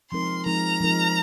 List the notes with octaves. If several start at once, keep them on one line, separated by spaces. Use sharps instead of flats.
F3 G#3 C4 D#4 A#4 C6
F3 G#3 C4 D#4 A#4 A#5
F3 G#3 C4 D#4 A#4